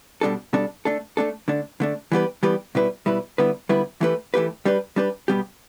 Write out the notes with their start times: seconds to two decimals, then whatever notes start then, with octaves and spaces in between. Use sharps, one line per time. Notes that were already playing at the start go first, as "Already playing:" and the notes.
0.21 B2 G3 D4 A4
0.53 B2 G3 D4 A4
0.85 A3 D4 A4
1.17 A3 D4 A4
1.48 D3 A3 D4
1.80 D3 A3 D4
2.12 E3 G3 B3 G4 B4
2.43 E3 G3 B3 G4 B4
2.75 B2 G3 E4 B4
3.06 B2 G3 E4 B4
3.38 D3 G3 B3 E4 B4
3.69 D3 G3 B3 E4 B4
4.01 E3 A3 G4 B4
4.34 E3 A3 G4 B4
4.65 G3 D4 G4 B4
4.96 G3 D4 G4 B4
5.28 B2 G3 B3 G4